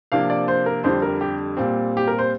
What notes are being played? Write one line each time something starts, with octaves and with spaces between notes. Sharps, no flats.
C3 F3 A#3 D4 F5
D5
C5
A#4
F2 D3 G3 C5
A#4
G4
A#2 G3 C4
G4
A#4
C5